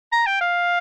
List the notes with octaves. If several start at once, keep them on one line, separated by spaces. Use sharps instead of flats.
A#5
G5
F5